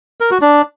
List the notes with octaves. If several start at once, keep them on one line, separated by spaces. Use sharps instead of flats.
A#4
F#4
D4